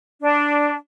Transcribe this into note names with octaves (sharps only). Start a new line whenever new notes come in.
D4